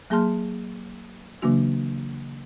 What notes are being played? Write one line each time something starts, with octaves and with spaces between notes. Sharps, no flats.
F#3 A#3 G#4 A5 C6 F6
C#3 E3 F#3 A#3 D4 F#4